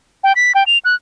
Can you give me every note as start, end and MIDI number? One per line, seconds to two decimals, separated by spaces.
0.24 0.33 79
0.35 0.52 95
0.55 0.63 79
0.66 0.78 101
0.85 0.95 90